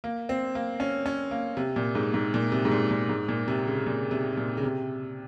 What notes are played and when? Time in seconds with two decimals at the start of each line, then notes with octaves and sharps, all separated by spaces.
0.04 A#3
0.29 C4
0.55 A#3
0.80 C#4
1.06 C#4
1.31 A#3
1.57 C3
1.76 A#2
1.95 G#2
2.14 G#2
2.34 A#2
2.52 C3
2.65 G#2
2.71 A#2
2.91 A#2
3.09 G#2
3.28 A#2
3.48 C3
3.67 C#3
3.86 A#2
4.11 C3
4.37 A#2
4.57 C#3
4.63 C3